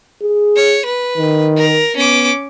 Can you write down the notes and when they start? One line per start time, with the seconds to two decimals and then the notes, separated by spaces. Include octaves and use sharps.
0.22 G#4
0.56 C#5
0.85 B4
1.18 D#3
1.57 A#4
1.96 B3 C#4 D6